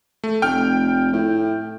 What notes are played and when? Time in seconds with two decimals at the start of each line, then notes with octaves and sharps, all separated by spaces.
0.24 A3
0.42 F1 G5 F6
1.13 A2